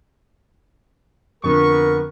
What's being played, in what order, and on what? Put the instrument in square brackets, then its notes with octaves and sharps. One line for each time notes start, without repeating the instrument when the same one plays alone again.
[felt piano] F2 D3 [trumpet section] B3 C#6 [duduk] A#4